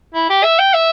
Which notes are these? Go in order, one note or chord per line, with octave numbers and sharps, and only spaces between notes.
E4
G4
E5
G5
E5